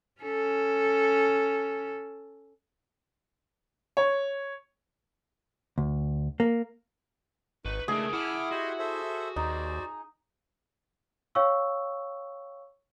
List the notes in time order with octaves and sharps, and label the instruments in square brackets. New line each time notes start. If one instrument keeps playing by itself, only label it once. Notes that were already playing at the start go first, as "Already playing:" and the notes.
[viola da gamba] C#4 A4
[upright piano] C#5
[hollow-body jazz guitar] D2
A#3
[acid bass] G#1 [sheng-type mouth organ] D#4 C#6 [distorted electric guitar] B4
[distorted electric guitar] C#2 A#4 [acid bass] A3 [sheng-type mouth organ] D4 E4 D#5 [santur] G#4
[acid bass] E4 [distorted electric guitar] F#5 A5 [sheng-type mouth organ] D6 F6
[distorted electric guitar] F#4 [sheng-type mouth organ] G4 D#5 C6
[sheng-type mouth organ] A4 C5 E5
[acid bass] D#2 [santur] D#4 [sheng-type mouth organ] C5 D5
[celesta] C#5 F5 G5 C#6 E6